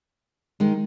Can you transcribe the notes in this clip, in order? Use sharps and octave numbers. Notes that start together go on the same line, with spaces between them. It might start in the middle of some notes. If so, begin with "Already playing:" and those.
D#3 G#3